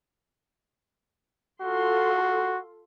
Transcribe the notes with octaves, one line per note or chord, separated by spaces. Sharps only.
F4 F#4 A4 C6